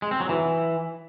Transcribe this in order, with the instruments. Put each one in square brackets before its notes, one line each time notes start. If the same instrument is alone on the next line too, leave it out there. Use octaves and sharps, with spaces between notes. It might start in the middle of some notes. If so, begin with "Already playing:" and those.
[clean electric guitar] G#3
C4
F#3
E3